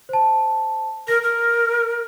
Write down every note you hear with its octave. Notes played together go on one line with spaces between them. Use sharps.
C5 A5
A#4 A#6
A#4